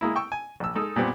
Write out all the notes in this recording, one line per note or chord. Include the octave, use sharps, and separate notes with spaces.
G#3 A#3 E4
G5 C#6 E6
G#5
A#1 E6
G#3 D#4 A4
A#2 G3 B3 C4